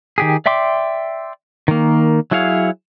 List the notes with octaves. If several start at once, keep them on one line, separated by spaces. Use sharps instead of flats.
D#3 G4 G#4
D5 E5 G5 C6 D6
D#3 A#3
F#3 E4 G#4 C#5 F5